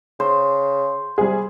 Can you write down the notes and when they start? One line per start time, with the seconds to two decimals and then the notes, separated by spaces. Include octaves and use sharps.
0.20 C#3 C5
1.18 C3 G3 G#4